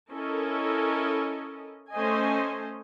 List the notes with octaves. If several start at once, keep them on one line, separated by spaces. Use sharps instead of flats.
C#4 E4 A4 A#4 D#5
A3 C#4 A4 C5 D#5 G#5